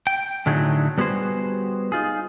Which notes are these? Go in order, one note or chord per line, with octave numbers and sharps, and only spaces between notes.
G5
A2 D3 F#3 A3 D#4 G#4
G3 B3 F#4 G#4 C5
D#4 F4 G#4